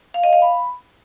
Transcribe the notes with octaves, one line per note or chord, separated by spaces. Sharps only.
F5
D#5
F5
B5